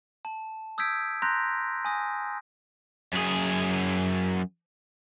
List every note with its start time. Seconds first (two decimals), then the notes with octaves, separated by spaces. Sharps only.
0.25 A5
0.78 D#6 E6 G6 G#6 B6 D7
1.22 A#5 C6 F#6 G6 A#6
1.85 G#5 D#6 A#6
3.13 F#2 G#4